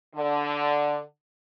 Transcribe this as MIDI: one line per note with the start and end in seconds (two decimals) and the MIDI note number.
0.16 0.99 50